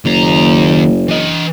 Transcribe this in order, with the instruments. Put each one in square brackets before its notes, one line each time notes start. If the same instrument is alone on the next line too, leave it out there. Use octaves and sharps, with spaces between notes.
[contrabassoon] F#1 [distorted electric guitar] D#2 A#5
[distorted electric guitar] E3 D#5